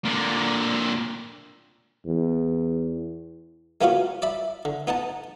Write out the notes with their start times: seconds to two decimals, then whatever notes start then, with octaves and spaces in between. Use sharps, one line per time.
0.05 A#2 D3
2.06 E2
3.81 G#3 A#3 B3 C#4 F4 F#4
4.22 D5 E5 B5
4.65 D3
4.87 B3 D#4 F#5 A5